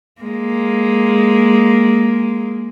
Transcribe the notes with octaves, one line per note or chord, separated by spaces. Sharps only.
G#3 A#3